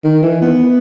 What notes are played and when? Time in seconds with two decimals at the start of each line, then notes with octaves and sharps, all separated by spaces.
0.04 D#3
0.23 E3
0.42 B3